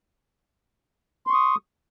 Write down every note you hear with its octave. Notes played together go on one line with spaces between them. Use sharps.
C6 C#6 D#6